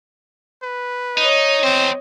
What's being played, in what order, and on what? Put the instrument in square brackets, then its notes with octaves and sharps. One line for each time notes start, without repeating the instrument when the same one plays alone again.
[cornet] B4
[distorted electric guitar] D#4 [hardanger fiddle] C#5 D#5
[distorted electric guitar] E2 C5 [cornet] C4